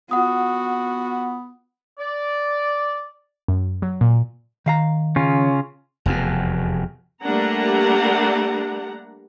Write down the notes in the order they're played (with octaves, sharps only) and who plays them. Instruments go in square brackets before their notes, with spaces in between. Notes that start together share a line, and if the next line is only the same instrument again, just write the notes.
[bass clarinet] B3 [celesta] F4 F#5 D#6 [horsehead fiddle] F#4
[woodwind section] D5
[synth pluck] F#2
F#3
A#2
[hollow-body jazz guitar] D#3 F5 A#5
[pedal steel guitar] C#3 C#4 F4
[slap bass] F1 E2 G2 B2
[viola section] G3 A3 A#3 D4 F#5 A#5